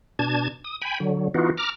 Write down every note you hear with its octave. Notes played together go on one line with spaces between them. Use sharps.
B2 D4 A5 G#6
D#6
G5 G#5 B5
D3 F#3
E3 B3 D#4 F4 F#4
A#5 D6 F6